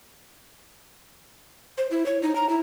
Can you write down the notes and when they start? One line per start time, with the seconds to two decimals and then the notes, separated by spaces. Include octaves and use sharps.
1.78 C5
1.91 E4
2.06 C#5
2.22 D#4
2.35 A#5
2.49 E4